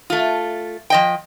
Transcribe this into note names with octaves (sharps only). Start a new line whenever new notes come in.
A3 F4
F3 D#5 G5